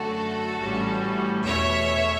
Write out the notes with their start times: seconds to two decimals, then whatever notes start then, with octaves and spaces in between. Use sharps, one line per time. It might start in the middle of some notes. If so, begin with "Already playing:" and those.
Already playing: F#2 D3 A3 C#4 F#4 A4
0.60 A1 A2 G3 C#4
1.46 E2 B2 A3 C#4 C#5 E5